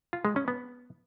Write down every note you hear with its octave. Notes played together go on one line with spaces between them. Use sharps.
F4
G#3
C#4
B3